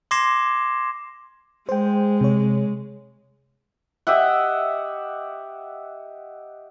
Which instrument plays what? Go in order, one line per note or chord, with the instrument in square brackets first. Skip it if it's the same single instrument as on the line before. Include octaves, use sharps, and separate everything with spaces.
[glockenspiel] C6 D6 G#6 A#6 C7 E7
[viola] G#3 [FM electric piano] C5 G5
[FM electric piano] C3 C#5
[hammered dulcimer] G4 D#5 E5 F#5